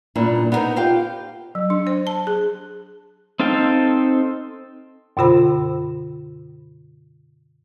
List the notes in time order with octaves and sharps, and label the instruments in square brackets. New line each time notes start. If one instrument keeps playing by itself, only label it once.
[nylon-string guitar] G2 A#2 A#3 D4 E4
B3 D#4 F#4 G#4 A#4 C5
F4 G4 C5 F5 G5
[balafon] F#3
D4
C5
A5
G#4
[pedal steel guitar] C4 D#4 A4 F5 G5
[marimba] F#2 B2 D3 F4 C5 B5